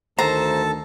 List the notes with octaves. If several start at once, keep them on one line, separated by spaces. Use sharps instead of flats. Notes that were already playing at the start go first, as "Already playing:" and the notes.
D2 D#3 A4 C5 A5 A#5